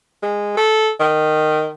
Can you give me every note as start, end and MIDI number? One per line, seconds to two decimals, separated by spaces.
0.23 0.56 56
0.57 0.90 69
1.00 1.69 51